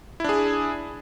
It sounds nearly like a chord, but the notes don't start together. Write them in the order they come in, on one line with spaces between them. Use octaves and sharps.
E4 D4 G#4